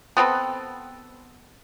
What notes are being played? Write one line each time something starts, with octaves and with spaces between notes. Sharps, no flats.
B3 C4 A4 B4